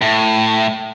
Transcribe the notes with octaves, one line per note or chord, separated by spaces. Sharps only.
A2